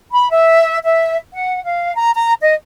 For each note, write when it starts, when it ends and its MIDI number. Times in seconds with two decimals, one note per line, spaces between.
0.12 0.29 83
0.31 0.77 76
0.83 1.16 76
1.33 1.64 78
1.64 1.93 77
1.95 2.11 82
2.14 2.33 82
2.42 2.55 75